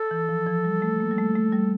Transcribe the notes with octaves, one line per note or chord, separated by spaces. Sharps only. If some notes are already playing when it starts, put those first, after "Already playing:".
Already playing: A4
E3
F3
F3
G3
A3
A#3
G3
A3
A3
G3